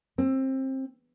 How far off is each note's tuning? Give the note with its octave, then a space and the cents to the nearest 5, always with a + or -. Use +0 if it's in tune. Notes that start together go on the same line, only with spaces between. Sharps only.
C4 +25